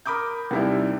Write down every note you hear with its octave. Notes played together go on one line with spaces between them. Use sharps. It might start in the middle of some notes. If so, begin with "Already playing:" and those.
A#4 B5 D6 D#6 G6
D#2 C3 G3 E4